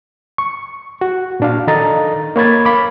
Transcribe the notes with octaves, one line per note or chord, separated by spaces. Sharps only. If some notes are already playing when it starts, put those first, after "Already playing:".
C#6
F#4
A#2 D4 F5
D#3 A4 D#5 A#5 A6
A#3 C#5 B5 G#6 A6
F5 B5 D6